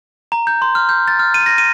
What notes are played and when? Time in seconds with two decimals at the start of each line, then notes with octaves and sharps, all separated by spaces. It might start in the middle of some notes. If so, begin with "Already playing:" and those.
0.32 A#5
0.47 G6
0.62 C6
0.75 F6
0.89 G6
1.08 A6
1.19 F6
1.34 D#7
1.46 A#6
1.58 D#7